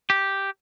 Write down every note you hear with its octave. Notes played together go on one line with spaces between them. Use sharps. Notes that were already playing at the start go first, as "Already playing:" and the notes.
G4